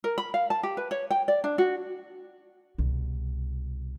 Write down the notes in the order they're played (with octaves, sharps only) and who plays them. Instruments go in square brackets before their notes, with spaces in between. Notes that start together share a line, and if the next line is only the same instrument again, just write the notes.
[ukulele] A#4
B5
F5
A5
G4
B4
C#5
G5
D5
D4
F#4
[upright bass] C2 B2